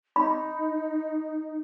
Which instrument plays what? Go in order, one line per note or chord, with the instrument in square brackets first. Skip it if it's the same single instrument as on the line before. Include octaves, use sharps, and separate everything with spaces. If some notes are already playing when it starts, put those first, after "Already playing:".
[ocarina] D#4 [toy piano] B5